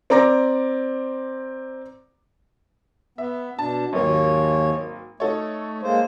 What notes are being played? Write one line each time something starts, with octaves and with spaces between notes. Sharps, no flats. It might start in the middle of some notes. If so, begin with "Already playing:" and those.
C4 D5 A#5 D6 A#6
B3 E5
B2 D4 A5
G#1 D#2 F#3 A#3 C#5
A3 D#4 A4 C#5
G#3 A#3 C5